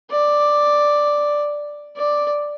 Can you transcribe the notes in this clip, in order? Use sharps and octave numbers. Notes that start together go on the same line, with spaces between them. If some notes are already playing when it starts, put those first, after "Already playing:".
D5
D5